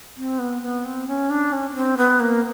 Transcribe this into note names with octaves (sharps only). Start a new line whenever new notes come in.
C4
B3
B3
C4
C#4
D4
C#4
C#4
C4
B3
A#3